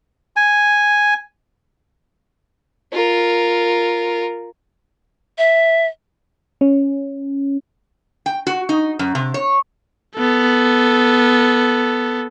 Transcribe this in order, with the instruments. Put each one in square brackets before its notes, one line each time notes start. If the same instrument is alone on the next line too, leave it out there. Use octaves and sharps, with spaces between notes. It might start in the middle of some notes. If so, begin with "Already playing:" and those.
[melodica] G#5
[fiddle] F4 A#4
[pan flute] E5
[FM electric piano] C#4
[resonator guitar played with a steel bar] G5
F#4
D#4
F#2
C3
C#5
[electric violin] B3 A4